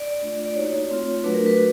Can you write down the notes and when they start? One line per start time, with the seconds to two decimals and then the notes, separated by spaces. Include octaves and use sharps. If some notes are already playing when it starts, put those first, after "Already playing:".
Already playing: D5
0.22 A3 D4 F4
0.46 D5
0.55 A#3 D#4 F#4 C#5
0.90 A3 C4 F4
1.23 F#3 A3 D4 F#4 B4
1.34 A#4
1.46 B4
1.57 F#4